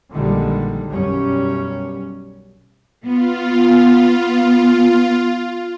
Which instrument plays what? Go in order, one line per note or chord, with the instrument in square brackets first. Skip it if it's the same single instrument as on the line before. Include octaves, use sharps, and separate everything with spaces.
[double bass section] A#1 D3 D#3 G3 G#3
B1 F#2 G3 C#4
[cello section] B3 [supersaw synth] F4